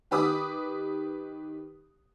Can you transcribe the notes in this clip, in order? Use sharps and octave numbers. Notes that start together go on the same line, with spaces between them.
D#3 G4 B4 D6 D#6